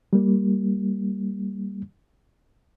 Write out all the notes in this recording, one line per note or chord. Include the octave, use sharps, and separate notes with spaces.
G3 A#3